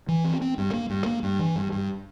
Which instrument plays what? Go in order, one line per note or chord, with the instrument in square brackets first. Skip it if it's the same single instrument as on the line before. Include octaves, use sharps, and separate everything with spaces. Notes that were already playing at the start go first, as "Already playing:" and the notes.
[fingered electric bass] E3
C4
C4
G2
A#3
G2
A#3
G2
E3
G2
G2